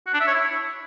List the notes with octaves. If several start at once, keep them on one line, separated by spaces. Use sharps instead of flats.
F#4
D4
E5
C#5
E4